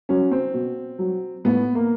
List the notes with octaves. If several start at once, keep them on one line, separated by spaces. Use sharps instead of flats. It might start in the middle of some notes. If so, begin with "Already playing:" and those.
F#3 C#4
C4
B2
F#3
A2 B3
A#3